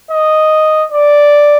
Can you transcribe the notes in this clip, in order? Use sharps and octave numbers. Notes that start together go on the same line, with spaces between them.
D#5
D5